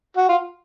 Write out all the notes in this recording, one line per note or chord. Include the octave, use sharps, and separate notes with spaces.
F#4
F4